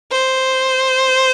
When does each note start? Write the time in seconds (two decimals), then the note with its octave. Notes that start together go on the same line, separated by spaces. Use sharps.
0.11 C5